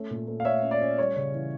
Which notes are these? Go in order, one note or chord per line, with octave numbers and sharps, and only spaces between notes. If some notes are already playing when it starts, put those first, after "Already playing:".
Already playing: A3 C#4
A#2
A3
F5
A3 C#5 E5
C#4
D5
C#4
G3 C#5
C#3
E3